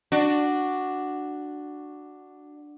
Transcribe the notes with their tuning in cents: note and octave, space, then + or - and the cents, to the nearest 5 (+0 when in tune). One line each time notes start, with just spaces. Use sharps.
D4 +5 F#4 +0